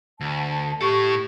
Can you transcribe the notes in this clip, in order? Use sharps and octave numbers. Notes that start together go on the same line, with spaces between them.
D2 A5
A2 G4 A4 C#6